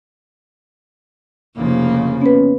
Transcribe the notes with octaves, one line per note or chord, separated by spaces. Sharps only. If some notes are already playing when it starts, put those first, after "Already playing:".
F1 C#3 F3 A#3
B3 C#4 B4